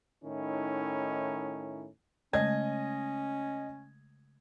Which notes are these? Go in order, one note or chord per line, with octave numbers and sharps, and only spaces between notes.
A2 D#3 C#4 D#4 E4
C#3 G#3 A3 C#4 D#5 G#6